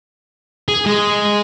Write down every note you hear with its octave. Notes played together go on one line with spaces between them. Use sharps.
G#4
G#3